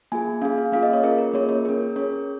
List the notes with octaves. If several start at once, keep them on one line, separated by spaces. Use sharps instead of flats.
A#3 F4 G#4 G#5
C#4 G#4 F5
F5
A#3 C#4 F4 G#4 F5
D#5
C#5
C#4 F4 G#4 A#4
A#4
A#3 F4 G#4 C#5
C#5
C#4 G#4 A#4
C#4 G#4 C#5